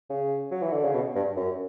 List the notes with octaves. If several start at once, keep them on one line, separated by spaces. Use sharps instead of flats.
C#3
F#3
E3
D3
C#3
B2
G2
F#2